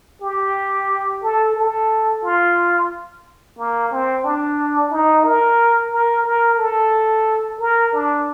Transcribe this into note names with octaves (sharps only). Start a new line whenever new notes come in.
G4
A4
A4
F4
A#3
C4
D4
D#4
A#4
A#4
A#4
A4
A#4
D4